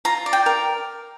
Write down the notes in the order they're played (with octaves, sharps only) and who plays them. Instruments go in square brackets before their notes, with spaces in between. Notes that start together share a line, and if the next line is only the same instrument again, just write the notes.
[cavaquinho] F4 A#5
D5
G5
A#4